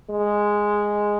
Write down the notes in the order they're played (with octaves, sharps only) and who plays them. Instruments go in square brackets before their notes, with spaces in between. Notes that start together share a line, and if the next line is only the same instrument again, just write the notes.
[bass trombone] G#3